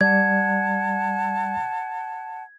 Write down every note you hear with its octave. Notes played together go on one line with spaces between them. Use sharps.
G3 D5 F#5 A5 G#6